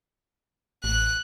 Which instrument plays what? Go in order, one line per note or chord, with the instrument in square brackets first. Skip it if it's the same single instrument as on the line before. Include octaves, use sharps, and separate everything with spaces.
[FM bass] A1 [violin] F#6